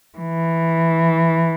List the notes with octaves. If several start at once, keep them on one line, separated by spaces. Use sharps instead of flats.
E3